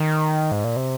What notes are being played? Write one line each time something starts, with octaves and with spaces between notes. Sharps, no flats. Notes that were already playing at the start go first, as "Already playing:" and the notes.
Already playing: D#3
G#2
A#2
C3